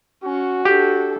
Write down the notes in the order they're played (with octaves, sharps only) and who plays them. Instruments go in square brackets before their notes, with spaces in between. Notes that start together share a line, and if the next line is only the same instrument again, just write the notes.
[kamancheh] C#4 [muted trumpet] F#4
[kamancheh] D4 A4 [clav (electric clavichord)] G4